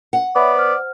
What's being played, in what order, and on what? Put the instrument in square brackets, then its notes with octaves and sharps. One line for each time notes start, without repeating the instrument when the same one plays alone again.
[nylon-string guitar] F#5
[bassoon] B3 [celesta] C#5 E5 B5 [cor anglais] D5
[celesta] C5 F6